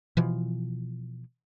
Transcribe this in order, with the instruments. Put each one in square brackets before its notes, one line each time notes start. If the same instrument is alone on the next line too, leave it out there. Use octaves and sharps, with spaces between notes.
[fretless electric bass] B2 E3 F3